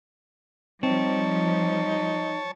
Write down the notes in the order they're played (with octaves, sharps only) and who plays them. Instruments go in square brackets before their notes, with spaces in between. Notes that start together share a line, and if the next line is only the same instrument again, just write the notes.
[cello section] F3 G3 [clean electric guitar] C4 [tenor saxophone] D#4 [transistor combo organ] C#5 A5